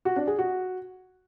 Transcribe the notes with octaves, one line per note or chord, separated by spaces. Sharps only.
F#4
D4
G#4
F#4